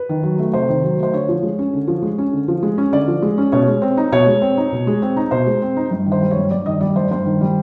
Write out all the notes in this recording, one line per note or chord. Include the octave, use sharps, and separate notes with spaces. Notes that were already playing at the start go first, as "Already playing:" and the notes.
Already playing: B4
D#3
F#3
A3
C3 C5
D#3
F#3
A3 C5
D3 C#5
F3
G#3
C#4
D3
F3
G#3
C#4
D3
F3
G#3
C#4
D3 D5
F3
G#3
C#4
B2 C#5
G#3
C4
D#4
B2 C#5
G#3
C4
D#4
B2
G#3
C4
D#4
B2 C5
G#3
C4
D#4
G2
D#3
C5
G3
C#5
G2
G2 D5
D#3 D#5
G3 D5
G2 C5
G2 C5
D#3
G3